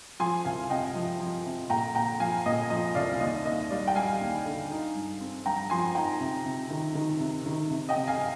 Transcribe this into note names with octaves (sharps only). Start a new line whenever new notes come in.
F3 G#5 C6
C2 F5 G#5
C3 D#5 G5
F3
F3
C3
A#2 G5 A#5
A#2 G5 A#5
F3 F5 G#5
A#2 D#5
F3 D#5
C2 D5 F5
D#2 D#5
D#2 D#5
G3 D5 F5
G5
G3 F5 G#5
D#2
D3
D#4
G2
C4
G2 G5 A#5
F3 G#5 C6
D#4 G5 A#5
C3
C3
D#3
D#3
C3
D#3
C3
D#5 G5
C3
F5 G#5